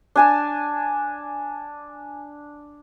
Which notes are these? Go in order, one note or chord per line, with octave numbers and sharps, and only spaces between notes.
D4 G#5 A5